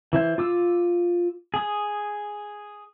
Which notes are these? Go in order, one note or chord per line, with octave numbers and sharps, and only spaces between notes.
E3 E4 C5
F4 D6 E6
G#4 D#6